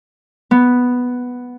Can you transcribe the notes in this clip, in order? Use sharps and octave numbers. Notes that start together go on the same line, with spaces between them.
B3